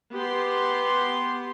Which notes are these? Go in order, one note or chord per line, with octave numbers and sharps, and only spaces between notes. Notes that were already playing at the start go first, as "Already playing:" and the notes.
B3 G4 C6